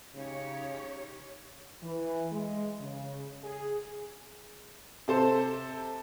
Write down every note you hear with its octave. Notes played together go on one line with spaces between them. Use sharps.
C#3 D#4 G4 C#5
E3
G#3
C#3
G#4
C3 A4 C5